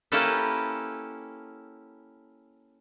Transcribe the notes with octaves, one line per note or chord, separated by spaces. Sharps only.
A#3 C#4 E4 G4 A4 B4